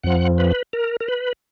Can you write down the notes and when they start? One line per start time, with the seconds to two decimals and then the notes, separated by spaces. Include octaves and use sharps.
0.03 F2 F3 F#5
0.38 B4
0.73 A#4
1.00 A#4
1.08 B4